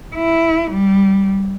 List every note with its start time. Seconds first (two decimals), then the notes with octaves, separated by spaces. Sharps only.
0.15 E4
0.71 G3